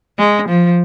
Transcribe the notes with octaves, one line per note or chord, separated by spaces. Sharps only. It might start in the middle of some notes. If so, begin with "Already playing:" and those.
G#3
F3